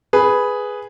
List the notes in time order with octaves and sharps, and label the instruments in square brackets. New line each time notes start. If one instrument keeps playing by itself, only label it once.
[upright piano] G#4 B4